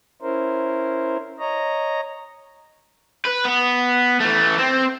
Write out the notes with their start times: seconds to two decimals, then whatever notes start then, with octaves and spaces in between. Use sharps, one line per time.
0.22 C#4 E4 A#4 C5
1.39 C#5 D#5 A#5
3.25 B4
3.45 B3
4.20 E3 A3
4.58 C4